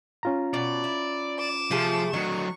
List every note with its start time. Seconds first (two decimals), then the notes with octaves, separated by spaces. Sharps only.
0.23 C#4 F4 A#5
0.54 B2 D5
0.84 E4
1.39 D6 E7
1.71 C3 F3 A3 G#4
2.13 D3 D#3 F#3 C#6